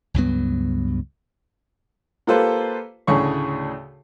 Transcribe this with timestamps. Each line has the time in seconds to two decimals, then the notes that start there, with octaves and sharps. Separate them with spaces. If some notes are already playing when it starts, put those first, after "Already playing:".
0.14 C#2 G2 F#3 B3
2.27 A#3 F4 G4 A4 B4 C5
3.07 D2 A2 C#3 G#4 C#5 C#6